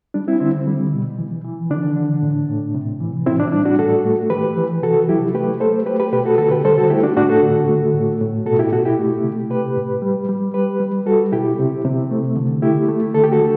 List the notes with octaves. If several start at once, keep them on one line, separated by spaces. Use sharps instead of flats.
G3 D4
C4 E4
D3 C4 E4
G3
B2
E3
E3
D3 D4
D3
A2
A2
C3
E3
A2 C4 E4
D4
E4
G3 D4
D4 F#4
A2 F#4 A4
A3
E3 G4 B4
E3
C3 F#4 A4
F#3 E4 G4
A3 G4 B4
A3 A4 C5
A3 G4 B4
G4 B4
B2 G4 B4
F#4 A4
D3 F#4 A4
G4 B4
G3 A4 C5
F#4 A4
A3 E4 G4
D4 F#4
A2 D4 F#4
F#4 A4
D3
A3
A2
A2
B2 F#4 A4
E4 G4
B2 F#4 A4
E4 G4
A3
C3
A3 G4 B4
A2
G3
G3
G3 G4 B4
G3
G3 F#4 A4
B2 E4 G4
C3
C3
A3
D3
A3 E4 G4
A3
D3 A4
G4
F#4 A4
D3